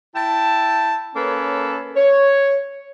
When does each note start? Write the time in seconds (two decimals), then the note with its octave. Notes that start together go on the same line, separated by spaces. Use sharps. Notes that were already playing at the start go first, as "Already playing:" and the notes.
0.15 E4 G5 A5
1.15 A#3 C#4 A4 B4 C#5
1.96 C#5